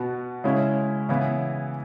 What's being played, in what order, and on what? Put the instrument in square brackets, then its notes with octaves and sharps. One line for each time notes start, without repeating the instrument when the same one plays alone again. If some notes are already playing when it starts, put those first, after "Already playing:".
Already playing: [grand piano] B2 B3 F#4
C#3 G#3 C#4 E4
C#3 E3 B3 E4